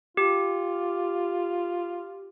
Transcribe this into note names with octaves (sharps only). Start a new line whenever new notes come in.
F4 G4